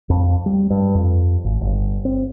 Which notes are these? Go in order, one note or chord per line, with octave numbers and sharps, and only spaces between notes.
F2
G3
G2
F2
G#1
G1
C4